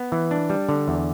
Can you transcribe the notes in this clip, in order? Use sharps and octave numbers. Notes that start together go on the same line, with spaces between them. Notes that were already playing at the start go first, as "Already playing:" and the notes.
Already playing: B3
E3
D4
G3
D3
E2